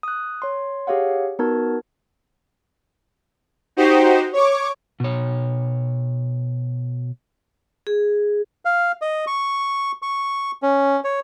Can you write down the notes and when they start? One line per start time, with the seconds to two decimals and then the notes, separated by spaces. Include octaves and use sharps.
0.03 D#6 F#6
0.42 C#5 C6
0.87 G4 G#4 C#5 F5 F#5
1.39 B3 D#4 F#4 A#4 A5 G#6
3.77 D#4 F#4 G4 C5
4.33 C#5 C#6 D6
5.00 B2 C#5
7.87 G#4
8.65 F5
9.02 D#5
9.27 C#6
10.02 C#6
10.62 C#4
11.04 C#5